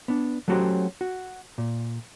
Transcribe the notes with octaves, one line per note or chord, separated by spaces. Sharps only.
B3 D4
F#3 A3 C#4 F#4 G4 C5
F#4
A#2